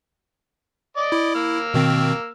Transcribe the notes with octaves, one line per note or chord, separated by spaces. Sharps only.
D5 D#5 D6
E4
A#3 E6 F6
B2 D#3 C4